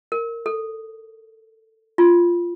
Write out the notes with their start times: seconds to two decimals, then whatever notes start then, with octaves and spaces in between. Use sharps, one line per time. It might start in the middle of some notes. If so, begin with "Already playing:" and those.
0.12 A#4
0.46 A4
1.98 F4